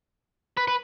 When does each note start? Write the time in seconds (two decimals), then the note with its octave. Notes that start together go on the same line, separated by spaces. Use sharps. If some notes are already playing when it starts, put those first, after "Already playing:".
0.57 B4
0.68 B4